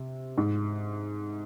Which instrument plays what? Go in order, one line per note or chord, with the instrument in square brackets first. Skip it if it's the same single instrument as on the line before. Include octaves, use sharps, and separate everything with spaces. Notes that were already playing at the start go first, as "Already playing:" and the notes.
Already playing: [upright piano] C3
G#2